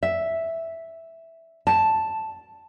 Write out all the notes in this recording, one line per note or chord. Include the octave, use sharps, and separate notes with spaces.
E5
A5